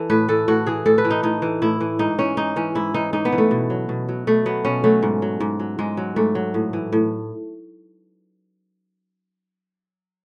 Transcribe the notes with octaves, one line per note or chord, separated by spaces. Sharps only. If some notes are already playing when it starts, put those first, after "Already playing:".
Already playing: E3 A4
A2 B4
E3 A4
A2 F#4
E3 G#4
A2 A4
B4
E3
D#4
A2 D#4
E3
A2 E4
E3
G#2 D#4
E3 C#4
G#2 D#4
E3 C#4
G#2 E4
E3 D#4
G#2 D#4
B3
E3
A3
B2
F#3
B2
F#3
B2 A3
F#3 B3
B2 C#4
F#3 A3
G#2
F#3
G#2
F#3
G#2 G#3
F#3
G#2 A3
F#3
A2
E3
A2